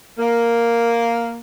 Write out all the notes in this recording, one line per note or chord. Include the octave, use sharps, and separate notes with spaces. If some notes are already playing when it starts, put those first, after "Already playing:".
A#3